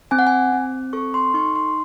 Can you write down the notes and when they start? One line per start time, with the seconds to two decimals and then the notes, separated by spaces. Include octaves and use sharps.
0.11 C4 G#5
0.19 F#5
0.27 G#5
0.52 C4
0.93 A4 C#6
1.14 C6
1.34 D#4 C#6
1.56 C6